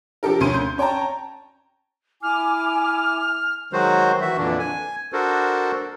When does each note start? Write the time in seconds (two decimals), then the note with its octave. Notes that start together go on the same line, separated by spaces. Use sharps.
0.23 D3 F3 G4 A4 A#4
0.40 D2 C#4 C6 D#7
0.54 G6
0.78 C#4 C#5 G5 A5 A#5
2.23 E4 G#5 D6 F6
3.73 D#3 F#3 G#3 F#4 C5
4.21 E3 F#4 E5
4.38 F2 A#2 D3 E3 D4
4.59 G#5
5.13 D4 F#4 A4 A#4 C5